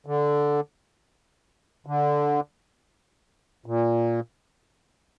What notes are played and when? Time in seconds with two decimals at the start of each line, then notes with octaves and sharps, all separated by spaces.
0.06 D3
1.86 D3
3.66 A#2